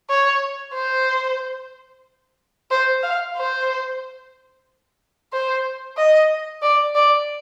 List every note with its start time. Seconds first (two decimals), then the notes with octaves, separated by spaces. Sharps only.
0.10 C#5
0.74 C5
2.71 C5
3.03 F5
3.37 C5
5.33 C5
5.97 D#5
6.62 D5
6.95 D5